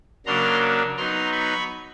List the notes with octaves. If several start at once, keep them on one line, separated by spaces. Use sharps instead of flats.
C#3 F#3 A#3 D4 A#5 C6
F#3 B3 D#4 A#5 C6
B5 C#6